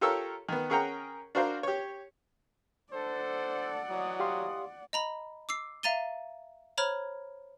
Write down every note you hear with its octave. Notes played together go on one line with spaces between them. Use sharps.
F4 G4 A4 A#4 C#5 E6
D#3 B3
C#4 G#4 A#4 F#5 G5 A#5
D4 F#4 A#4 C5 F5
G4 C#5
D4 A4 C5 D5 F#5
E3 F#3 D#5 D#6
G4 F5 C6
D#5 A#5 B5
D6 E6 C7
E5 F5 A#5 A6 D#7 G7
C5 C#5 A#5 B5 F6 G#6